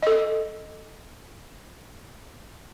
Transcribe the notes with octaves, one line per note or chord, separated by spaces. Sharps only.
A4 D#5